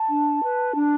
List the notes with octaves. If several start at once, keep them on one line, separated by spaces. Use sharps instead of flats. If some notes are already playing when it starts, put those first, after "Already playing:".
Already playing: A5
D4
B4
D4